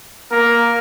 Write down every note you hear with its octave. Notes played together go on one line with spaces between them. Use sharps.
A#3 A#4